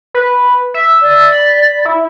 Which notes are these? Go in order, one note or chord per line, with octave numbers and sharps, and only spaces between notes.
B4
E5
D5
B5
E4